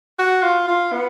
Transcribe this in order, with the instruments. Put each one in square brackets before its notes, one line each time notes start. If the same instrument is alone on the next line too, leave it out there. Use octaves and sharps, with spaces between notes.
[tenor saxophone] F#4
F4
F4
B3